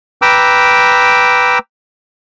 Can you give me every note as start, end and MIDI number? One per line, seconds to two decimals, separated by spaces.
0.22 1.59 71
0.22 1.59 79
0.22 1.59 82
0.22 1.59 86
0.22 1.59 88